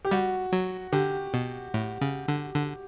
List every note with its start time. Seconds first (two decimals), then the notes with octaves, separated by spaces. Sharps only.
0.05 G4
0.11 G3 F#4
0.53 F#3
0.92 D3 G4
1.34 B2
1.74 A2
2.01 C#3
2.28 D3
2.55 D3